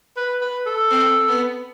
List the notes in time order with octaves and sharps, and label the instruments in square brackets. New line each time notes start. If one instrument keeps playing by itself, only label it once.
[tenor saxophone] B4
B4
A4
[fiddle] C4
B3